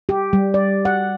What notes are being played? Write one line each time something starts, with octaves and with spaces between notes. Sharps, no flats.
G4
G3
D5
F#5